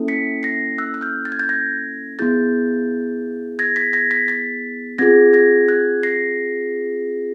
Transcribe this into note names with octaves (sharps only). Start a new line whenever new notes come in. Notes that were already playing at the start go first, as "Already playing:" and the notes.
Already playing: A#3 C#4 E4 A4
B6 C#7
A#6 C7
E6 F#6
F#6
F6 G6
A6
G#6
G6 A6
G#6 A#6
B3 E4 G#4 G6 A6
G#6 A#6
A6 B6
G#6 A#6
A6 B6
A6 B6
C4 F4 G#4 G#6 A#6
G#6 A#6
F#6 G#6
A#6 C7